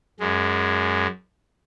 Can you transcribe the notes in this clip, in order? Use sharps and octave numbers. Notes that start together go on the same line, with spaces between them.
F#2 G#3